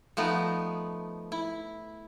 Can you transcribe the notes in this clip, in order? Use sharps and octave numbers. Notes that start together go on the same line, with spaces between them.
F3 A3 B3 D#4
E4